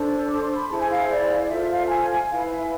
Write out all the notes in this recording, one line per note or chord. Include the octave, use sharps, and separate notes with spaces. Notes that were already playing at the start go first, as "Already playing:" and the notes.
Already playing: D4 A4 C5
D6
C6
B5
E4 G#4 C5 A5
G#5
F5
D5
D5
F4 A4 C5 E5
F5
A5
G#5
E4 B4 F5
E5